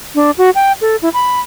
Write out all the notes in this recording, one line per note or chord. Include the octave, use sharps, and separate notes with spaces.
D4
F#4
G5
A4
E4
B5